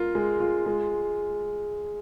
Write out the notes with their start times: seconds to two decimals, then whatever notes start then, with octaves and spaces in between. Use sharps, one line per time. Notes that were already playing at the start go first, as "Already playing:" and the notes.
Already playing: F4 A#4
0.15 G#3
0.40 F4
0.66 G#3